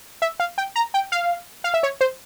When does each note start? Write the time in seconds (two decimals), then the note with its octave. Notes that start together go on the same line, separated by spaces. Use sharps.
0.22 E5
0.40 F5
0.58 G5
0.76 A#5
0.94 G5
1.12 F5
1.64 F5
1.74 E5
1.83 C#5
2.01 C5